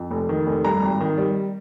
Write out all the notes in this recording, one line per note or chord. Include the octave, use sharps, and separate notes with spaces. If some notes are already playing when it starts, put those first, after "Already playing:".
Already playing: F2
F1
D#3
F1
G2 A#5
G#1
D#3
G3